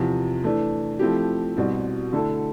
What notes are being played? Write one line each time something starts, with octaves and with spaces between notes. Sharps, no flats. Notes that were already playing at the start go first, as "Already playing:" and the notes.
Already playing: E2 C3 F3
E3 A3 D4
F3 A3 C4 E4 G4
C2 B2 G3 C4
D3 A3 E4 A4